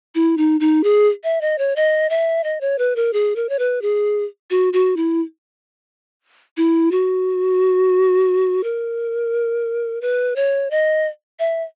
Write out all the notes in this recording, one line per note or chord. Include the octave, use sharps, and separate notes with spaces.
E4
D#4
D#4
G#4
E5
D#5
C#5
D#5
E5
D#5
C#5
B4
A#4
G#4
A#4
C#5
B4
G#4
F#4
F#4
E4
E4
F#4
A#4
B4
C#5
D#5
E5